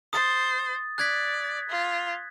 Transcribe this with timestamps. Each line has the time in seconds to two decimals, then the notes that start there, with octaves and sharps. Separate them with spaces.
0.13 C5 D#6 A6
0.98 D5 F#6 G#6 B6
1.70 F4